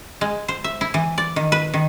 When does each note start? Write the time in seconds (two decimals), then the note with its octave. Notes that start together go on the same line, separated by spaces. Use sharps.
0.21 G#3
0.48 C5
0.64 E5
0.81 E4
0.94 E3
1.18 D5
1.36 D#3
1.52 B4
1.74 D#3